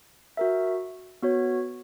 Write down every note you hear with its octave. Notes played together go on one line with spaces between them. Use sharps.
F#4 A#4 E5
B3 F#4 C#5